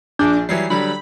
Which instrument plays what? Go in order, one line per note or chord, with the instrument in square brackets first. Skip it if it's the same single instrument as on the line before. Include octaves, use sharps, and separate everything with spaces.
[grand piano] A#1 G#4 G6 [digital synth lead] D4
[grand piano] E3 F#3 G3 [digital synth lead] C7
[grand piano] D3 F#3 G3 [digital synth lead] B5